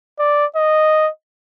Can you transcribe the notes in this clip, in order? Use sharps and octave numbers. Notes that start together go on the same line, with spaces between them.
D5
D#5